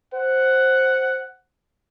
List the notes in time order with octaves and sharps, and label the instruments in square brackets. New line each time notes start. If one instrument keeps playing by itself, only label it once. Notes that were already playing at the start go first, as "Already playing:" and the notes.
[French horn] C5 [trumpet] F#5